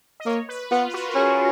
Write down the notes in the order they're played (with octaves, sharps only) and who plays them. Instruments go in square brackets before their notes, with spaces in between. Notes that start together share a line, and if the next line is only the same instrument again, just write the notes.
[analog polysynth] D#5
[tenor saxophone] A#3 [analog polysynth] C#5
[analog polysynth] B4
[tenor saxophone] B3 [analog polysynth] F4
[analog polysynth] F4
F#4
A#4
[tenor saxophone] C#4 [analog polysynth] G#4